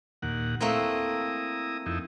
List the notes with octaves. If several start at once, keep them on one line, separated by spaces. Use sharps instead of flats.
D#2 A#2 F#5
A3 A#3 C4 E4 A#5 D#6
F2 D#4 E4